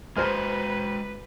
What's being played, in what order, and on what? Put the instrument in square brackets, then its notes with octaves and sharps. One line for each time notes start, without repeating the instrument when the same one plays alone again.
[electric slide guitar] G#3 F#4 [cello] B4 [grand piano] C5 F6